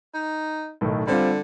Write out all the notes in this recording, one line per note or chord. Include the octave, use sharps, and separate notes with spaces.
D#4
B1 A2 D#3
D3 G3 C4 F4